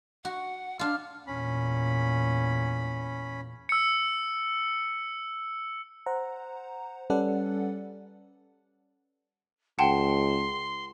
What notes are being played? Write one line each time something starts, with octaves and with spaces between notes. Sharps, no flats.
F#4 F#5
D4 F4 F6
E2 A#2 C#4 B5
E6 C#7
C5 F#5 A#5
G3 C#4 A4 B4 D5 F#5
C#2 F#5 G5 A5 C6